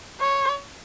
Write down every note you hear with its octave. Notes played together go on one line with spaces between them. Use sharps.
C#5